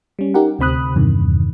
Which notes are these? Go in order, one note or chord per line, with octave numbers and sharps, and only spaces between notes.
G3 C#4
D#4 G4 A#4 F#5
D2 C3 C4 B5 D#6 F#6
E2 G2 C3 D#3